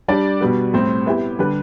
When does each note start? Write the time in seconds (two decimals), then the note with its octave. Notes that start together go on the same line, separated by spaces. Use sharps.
0.08 G3 D4 G4 D5
0.41 B2 G3 B3
0.74 A2 G3 C4
1.06 B3 E4 G4
1.39 D3 G3 D4 G4 B4